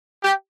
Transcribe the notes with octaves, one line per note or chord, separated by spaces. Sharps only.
G4